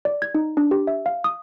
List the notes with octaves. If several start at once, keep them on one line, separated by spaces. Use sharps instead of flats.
D5
G#6
D#4
D4
G4
E5
F5
D#6